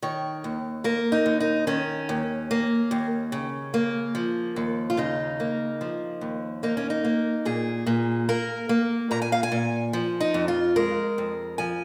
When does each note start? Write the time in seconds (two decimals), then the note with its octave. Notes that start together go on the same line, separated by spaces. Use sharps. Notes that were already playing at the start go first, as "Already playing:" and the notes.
0.02 D#3 C#5
0.44 D#2
0.84 A#3 A#4
1.12 D#4
1.26 D#2
1.40 D#4
1.67 D#3 C#4
2.09 D#2
2.51 A#3
2.91 D#2
3.32 C#3
3.74 A#3
4.15 F3
4.56 D#2
4.90 F4
4.97 C#3 D#4
5.40 A#3
5.81 F3
6.21 D#2
6.63 A#3 D#4
6.77 C#4
6.90 D#4
7.05 A#3
7.45 A#2 G#4
7.86 A#2
8.29 A#3 A#4
8.69 A#3
9.11 A#2 A#5
9.22 G#5
9.32 F5
9.43 G#5
9.52 A#2
9.93 F3
10.20 D#4
10.34 F2
10.48 F4
10.76 G#3 A#4
11.18 F2
11.58 F3 G#5